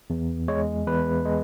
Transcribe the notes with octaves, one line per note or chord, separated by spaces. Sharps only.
E2
G#3 C#5
E2 B4
G#3